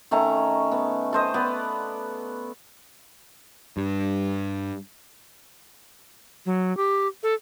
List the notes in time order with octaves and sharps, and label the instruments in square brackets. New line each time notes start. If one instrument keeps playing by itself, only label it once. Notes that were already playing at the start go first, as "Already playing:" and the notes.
[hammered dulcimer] D#3 A3 C#4 A#5
B3
A4 C5 D#5
B3 D5
[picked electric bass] G2
[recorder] F#3
G4
A4